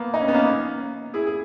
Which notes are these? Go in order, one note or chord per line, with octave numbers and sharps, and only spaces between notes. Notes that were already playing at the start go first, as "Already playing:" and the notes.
Already playing: A#3 B3
D#4
C#4
B3
A#3 C#4
E4 G#4
G#4